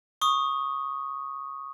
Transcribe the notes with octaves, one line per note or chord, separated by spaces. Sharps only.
C#6 D#6